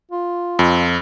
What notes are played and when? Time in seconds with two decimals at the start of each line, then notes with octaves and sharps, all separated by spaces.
0.11 F4
0.59 F2